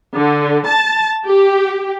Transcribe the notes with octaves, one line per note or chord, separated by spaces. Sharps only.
D3
A5
G4